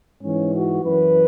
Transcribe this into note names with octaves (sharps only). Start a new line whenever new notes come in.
G#2 E3 C#4
F#4
F#2 E3 B4